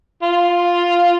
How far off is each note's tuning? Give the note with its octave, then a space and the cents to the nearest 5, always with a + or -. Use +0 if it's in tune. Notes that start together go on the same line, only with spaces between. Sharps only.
F4 +0